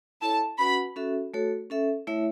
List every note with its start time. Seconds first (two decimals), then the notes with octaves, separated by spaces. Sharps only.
0.22 E4 A4 C#5 A5
0.58 C#4 F#4 B4 F#5 B5
0.96 C#4 F#4 A4 E5
1.34 A3 F#4 A4 C#5
1.70 C#4 A4 E5
2.07 A3 E4 C#5 E5